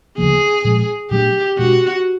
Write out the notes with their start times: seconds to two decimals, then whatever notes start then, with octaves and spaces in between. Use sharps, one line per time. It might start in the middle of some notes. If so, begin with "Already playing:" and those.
0.18 D2 C#3 F3 A#3 G#4
0.65 A#2 F3 G#3
1.11 A#2 F#3 A3 D4 G4
1.58 B2 G#3 B3 D4 F#4